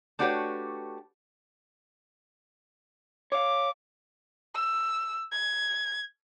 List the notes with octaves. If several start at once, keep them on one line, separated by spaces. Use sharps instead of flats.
A3 D4 F#4 G4 B4 C#5
C#5 F5 D6
E6
G#6